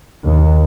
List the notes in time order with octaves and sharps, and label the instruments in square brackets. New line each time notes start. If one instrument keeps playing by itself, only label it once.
[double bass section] D#2